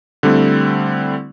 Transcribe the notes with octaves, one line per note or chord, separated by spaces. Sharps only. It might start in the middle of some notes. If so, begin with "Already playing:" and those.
D3 G3 A3 C4 E4